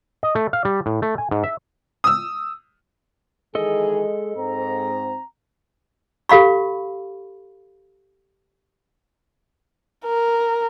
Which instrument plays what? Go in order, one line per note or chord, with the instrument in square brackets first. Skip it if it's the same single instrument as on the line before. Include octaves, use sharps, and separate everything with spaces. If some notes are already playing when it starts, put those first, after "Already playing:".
[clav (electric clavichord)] D#5
A3
F5
G3
A2
A3
G#5
G#2
E5
[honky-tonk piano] D#6 E6
[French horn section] D#3 E3 G#4 [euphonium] G#3 [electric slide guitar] A4 D#5
[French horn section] G#2 [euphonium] C4 [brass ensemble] A#5
[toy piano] G4 A4 F5 B5 C#6
[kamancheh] A#4